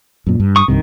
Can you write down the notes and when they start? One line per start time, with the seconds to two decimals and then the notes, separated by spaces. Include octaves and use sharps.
0.27 F#2 A#2
0.40 G2
0.56 C#6 D#6
0.68 C2 G2 C3 D#3